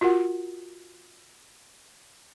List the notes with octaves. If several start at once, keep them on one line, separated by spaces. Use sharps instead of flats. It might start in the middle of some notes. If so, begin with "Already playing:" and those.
F4 F#4 A#4 F#5